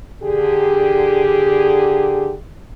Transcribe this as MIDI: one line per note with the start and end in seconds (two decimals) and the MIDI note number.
0.23 2.35 50
0.23 2.35 67
0.23 2.35 68